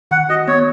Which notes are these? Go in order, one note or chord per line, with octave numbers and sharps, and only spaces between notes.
D#3 F#5
F#4 D#5
B3 C#5